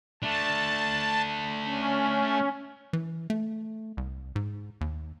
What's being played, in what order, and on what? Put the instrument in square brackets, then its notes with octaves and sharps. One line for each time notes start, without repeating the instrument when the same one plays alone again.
[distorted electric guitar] A3 D4 [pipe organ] A5
[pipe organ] C#4
[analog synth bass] E3
A3
C2
G#2
D#2